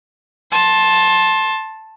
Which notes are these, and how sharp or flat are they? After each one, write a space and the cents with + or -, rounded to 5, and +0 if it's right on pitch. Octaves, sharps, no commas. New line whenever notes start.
A5 +0 C6 +25